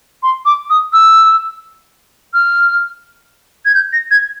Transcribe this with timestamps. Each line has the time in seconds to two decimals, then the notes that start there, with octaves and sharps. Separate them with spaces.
0.23 C6
0.46 D6
0.70 D#6
0.93 E6
2.34 F6
3.65 G#6
3.75 G6
3.93 A#6
4.11 G#6